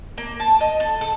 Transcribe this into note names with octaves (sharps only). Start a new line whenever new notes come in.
A#3
A5
D#5
A4
A4